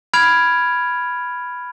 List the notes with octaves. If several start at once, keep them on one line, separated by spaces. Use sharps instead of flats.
B5 F6 G#6 D7 F7